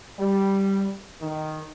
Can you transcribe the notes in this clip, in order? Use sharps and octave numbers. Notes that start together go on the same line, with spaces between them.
G3
D#3